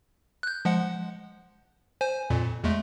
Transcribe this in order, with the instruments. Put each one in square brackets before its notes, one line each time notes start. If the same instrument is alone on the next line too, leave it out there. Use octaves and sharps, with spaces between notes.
[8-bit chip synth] F#6 G6
F3 G#3 F#5
C5 G#5
F2 A#2
E2 G#3 A3